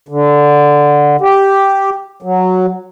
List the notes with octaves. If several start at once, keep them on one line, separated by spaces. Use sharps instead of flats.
D3
G4
F#3